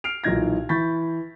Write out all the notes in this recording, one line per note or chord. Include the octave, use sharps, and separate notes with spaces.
F6 C7 D7 F7
B1 A#2 E3 D#4 G#6 A#6
E3 B5 C#6 G6 A6 B6